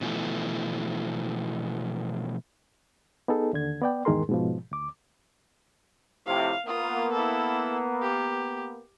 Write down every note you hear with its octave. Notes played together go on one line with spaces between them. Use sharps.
B2 E3 F3 A3
B3 D#4 G#4 A4
D#2 D3 G#6
B3 D5 G5
E2 G#2 D#3 G#4 A#4 C6
G#2 B2 F3
D2 D6
F2 A2 C3 F5
A#3 B3 F4 D#6
E4 A4
G4